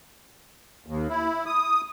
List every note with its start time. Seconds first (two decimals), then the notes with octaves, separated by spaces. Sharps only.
0.86 D#2
1.09 E4
1.46 D#6